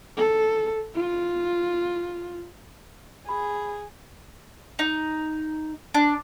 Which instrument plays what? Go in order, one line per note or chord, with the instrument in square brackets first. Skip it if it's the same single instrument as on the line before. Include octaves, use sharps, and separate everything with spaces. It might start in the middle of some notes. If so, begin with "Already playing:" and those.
[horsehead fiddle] A4
F4
[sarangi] G#4 [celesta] B5
[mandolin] D#4
D4